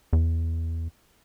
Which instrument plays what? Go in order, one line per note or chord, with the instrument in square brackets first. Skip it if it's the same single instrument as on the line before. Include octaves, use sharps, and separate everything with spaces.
[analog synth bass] E2